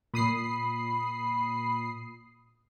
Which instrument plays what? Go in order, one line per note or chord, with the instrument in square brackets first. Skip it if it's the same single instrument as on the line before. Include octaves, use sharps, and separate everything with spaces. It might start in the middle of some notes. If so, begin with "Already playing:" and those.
[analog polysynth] A#2 D#6 C7 [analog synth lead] B5